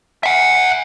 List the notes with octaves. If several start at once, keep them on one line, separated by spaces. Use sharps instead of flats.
E5 F#5